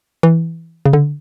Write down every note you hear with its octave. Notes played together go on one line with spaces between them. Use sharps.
E3
C#3
D3